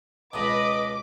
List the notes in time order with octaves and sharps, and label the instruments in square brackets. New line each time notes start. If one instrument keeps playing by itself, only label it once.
[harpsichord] C#2 B2 [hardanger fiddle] B4 B5 [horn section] D#5 [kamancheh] D6